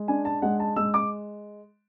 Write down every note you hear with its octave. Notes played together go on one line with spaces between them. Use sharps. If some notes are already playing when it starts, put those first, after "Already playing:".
Already playing: G#3
D4 G#5
A5
G#3 F#5
A5
G#3 E6
D6